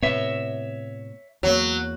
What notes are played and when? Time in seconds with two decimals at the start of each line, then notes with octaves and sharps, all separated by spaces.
0.03 A2 C3 B3 C#5 E5
1.43 E2 F#3 A#3